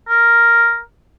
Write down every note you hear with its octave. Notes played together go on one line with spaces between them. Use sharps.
A#4